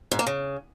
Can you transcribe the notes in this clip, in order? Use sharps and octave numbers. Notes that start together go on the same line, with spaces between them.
G#2
A#3
C#3